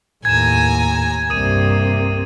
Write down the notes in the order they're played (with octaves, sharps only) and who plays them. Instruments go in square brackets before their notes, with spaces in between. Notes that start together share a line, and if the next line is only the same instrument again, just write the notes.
[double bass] D#2 A2 [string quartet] G#5 A#5 [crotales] G#6 E7
[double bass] C2 G2 [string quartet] C3 A#3 [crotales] D#6 D#7